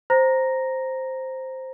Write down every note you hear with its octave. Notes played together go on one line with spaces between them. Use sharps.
C5 A#5 A#6